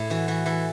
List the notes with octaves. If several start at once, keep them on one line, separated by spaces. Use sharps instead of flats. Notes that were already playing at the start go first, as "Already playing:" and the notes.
Already playing: A2 E4 A4
E3 F#4
E3 F#4
E3 A4